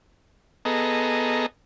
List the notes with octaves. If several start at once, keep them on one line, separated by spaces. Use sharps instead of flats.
B3 G#4 A4 D#5 A#5